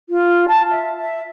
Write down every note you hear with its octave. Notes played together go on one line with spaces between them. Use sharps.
F4
A5
E5
E5